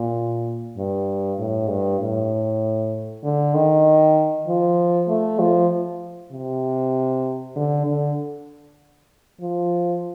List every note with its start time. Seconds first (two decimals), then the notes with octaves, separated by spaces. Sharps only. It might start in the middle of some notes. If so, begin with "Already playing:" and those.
Already playing: A#2
0.77 G2
1.39 A2
1.69 G2
2.01 A2
3.23 D3
3.54 D#3
4.47 F3
5.09 A3
5.39 F3
6.32 C3
7.56 D3
7.87 D3
9.41 F3